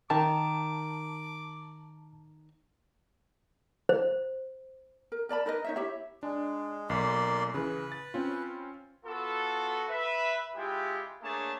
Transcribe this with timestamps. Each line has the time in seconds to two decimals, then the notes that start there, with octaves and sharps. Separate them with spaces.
0.10 D#3 A5 D6
3.89 C5
5.12 A#4
5.29 A#4 D5 A5 B5
5.46 D#4 A#4 B4 D#5
5.64 D#4 C#5 E5
5.76 E4 G4 C#5 E5
6.23 G#3 D4
6.90 B1 A#3 D5 C6
7.54 C#3 E3 B4
7.92 A6
8.14 C4 C#4 F4
9.05 B3 F4 F#4 A4
9.89 B4 E5
10.56 G#3 E4 F4 G4
11.23 A3 A#3 D4 G#4 C#5 A5